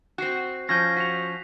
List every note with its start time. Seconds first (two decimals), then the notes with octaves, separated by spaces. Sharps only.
0.18 C4 F#4 F#6 C7
0.69 F3 C#4 G6 A#6
0.97 F#4 B6 F7